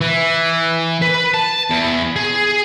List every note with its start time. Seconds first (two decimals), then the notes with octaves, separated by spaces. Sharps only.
0.01 E3
1.02 B4
1.34 A5
1.70 E2
2.16 G#4